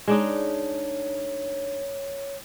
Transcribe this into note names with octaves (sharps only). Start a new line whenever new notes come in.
G#3 D4 D#4 C#5